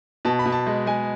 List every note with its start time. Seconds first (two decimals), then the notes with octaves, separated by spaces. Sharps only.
0.25 B2 A5
0.39 B5
0.46 B2
0.52 A5
0.67 G#3
0.86 G#3 G#5